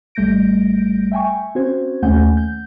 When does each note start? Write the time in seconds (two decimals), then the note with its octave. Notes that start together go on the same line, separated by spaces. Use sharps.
0.15 G#1 G3 A3 G6 A#6 D7
1.12 E5 G5 G#5 C#6
1.55 C4 C#4 F#4 C5 G#6
2.03 D#2 A3 C#4 F#5 G#5 G6
2.37 G6